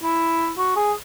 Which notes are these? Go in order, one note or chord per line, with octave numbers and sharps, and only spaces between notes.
E4
F#4
G#4